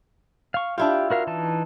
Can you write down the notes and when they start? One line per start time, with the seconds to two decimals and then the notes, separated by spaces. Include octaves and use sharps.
0.54 F5 C#6
0.78 D4 E4 F4 G4
1.11 F#4 A#4 F5
1.27 E3 D#4 A5